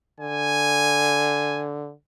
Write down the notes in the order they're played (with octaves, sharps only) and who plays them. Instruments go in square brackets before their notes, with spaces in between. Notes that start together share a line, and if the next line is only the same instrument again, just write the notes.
[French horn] D3 [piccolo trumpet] G#5